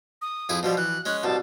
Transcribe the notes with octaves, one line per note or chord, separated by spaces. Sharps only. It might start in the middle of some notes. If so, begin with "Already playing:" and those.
D#6
F2 E4 G#4
B2 F3 G3
E3 F#6
G#3 C#4 F#6
C2 B2 A5